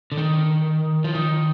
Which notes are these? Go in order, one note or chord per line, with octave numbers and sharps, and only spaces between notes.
D3
D#3
F3
D#3